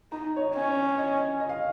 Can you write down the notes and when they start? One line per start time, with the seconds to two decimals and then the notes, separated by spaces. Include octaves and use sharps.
0.12 D#4 A#5
0.36 C#5
0.40 D#5
0.55 C#4
0.69 C#5
0.98 D#5
1.40 D#5
1.49 F5